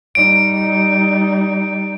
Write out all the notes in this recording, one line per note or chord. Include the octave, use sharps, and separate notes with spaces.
G3 D#4 D7